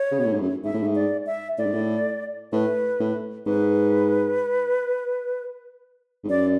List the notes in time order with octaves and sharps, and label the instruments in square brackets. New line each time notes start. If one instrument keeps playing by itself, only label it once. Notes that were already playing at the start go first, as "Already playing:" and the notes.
Already playing: [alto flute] C#5
[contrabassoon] C#3
B2
A2
G#2
F#2
[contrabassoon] G#2 [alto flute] E5
[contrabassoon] A2
G#2
[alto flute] D5
E5
[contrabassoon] A2 [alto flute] D5
[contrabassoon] G#2
A2
[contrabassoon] A2 [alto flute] B4
[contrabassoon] A2
[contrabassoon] G#2 [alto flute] B4
[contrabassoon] G#2
[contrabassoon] F#2 [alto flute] D5